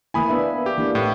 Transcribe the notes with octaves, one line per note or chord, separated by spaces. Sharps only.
E3 A#3 E4 G#5 B5 D#6
B3 D4 E5
G4
E3 A#3 D4
A2